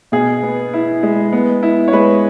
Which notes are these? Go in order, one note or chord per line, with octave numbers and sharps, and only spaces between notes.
B2 G#4
B3
E4
G#3
B3
E4
C#5
G#3 B4